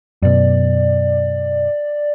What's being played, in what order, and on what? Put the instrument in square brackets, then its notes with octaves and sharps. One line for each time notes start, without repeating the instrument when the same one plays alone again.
[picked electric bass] F#2 B2 [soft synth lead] D5